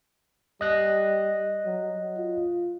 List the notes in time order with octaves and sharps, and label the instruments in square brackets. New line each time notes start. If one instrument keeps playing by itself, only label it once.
[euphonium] G3 [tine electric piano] D#5 F#6 A#6
[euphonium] F#3
F4